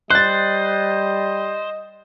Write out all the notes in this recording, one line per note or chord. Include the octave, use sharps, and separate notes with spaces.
G3 C5 D#5 F#6 A6